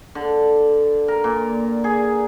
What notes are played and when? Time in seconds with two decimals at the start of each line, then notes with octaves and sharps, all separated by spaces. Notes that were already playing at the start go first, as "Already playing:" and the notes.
0.15 D3
1.08 A#4
1.24 A#2
1.84 G#4